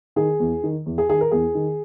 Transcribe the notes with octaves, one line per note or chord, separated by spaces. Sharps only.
D#3 G#4
E2
D#3
E2
G#4
D#3 G#4
A#4
E2 G#4
D#3